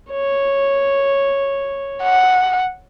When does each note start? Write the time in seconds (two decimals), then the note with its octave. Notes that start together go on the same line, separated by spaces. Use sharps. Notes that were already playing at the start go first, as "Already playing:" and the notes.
0.11 C#5
2.03 F#5